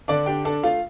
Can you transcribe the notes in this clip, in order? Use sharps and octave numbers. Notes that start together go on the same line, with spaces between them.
D3 D4 D5
D4 G4 G5
D4 A4 A5
A3 F4 F5